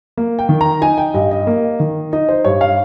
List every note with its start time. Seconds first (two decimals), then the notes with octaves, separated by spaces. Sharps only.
0.17 A#3
0.39 G5
0.49 D#3
0.61 A#5
0.81 D#4 G#5
0.98 G5
1.14 G2 D#5
1.31 D#5
1.47 A#3
1.80 D#3
2.13 D#4 D#5
2.29 C5
2.45 G2 C#5
2.61 F5